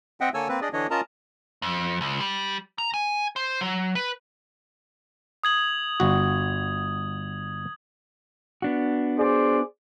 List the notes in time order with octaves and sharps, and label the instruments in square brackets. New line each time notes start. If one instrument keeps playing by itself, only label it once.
[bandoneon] C4 D#5 E5 F#5 G5
D3 A#3 A4 C#5 G#5 E6
A#3 C4 B4
D4 G#4 D5 D#5
D3 E3 D4 C#5 D#5
C#4 F4 A#4 D#5 A5 A#5
[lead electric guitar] F2
C#2
G3
A#5
G#5
C5
F#3
B4
[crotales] D#6 G#6 F#7
[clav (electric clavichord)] G1 F#4
[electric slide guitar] B3 D4 F#4
[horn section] G#4 C5 D5